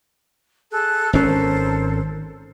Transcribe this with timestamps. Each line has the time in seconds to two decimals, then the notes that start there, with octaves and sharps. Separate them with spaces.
0.71 G#4 A4 F#6
1.13 G#1 C#4 A4 A#4 C5